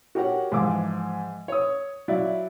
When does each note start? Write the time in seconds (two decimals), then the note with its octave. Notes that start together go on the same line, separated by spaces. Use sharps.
0.15 F#4 G4 A#4 C#5 F#5
0.52 G#2 E3 F3 F5 D6
1.48 C#5 D#6
2.08 F#3 E4 D5 E5 F5